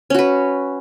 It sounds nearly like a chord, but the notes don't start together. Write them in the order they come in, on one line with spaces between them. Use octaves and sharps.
C#4 F#4 B4